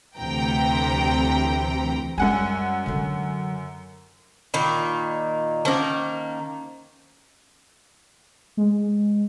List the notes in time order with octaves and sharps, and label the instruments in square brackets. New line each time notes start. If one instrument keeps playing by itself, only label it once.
[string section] D2 C3 E3 G5 A#5
[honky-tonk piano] F#2 F#5 G#5 [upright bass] G3 G#3
[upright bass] D3 F#3
[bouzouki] A#2 D#3 A#3 [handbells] B5
[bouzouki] D#3 A#3 [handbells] C#4 C5 A5
[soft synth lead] G#3